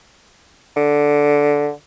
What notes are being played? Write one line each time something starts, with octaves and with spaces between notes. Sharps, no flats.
D3